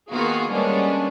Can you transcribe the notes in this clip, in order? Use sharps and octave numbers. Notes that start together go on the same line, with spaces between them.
D#3 A#3 B3 F4 F#4 G#4
G3 G#3 A#3 B3 C#4 D4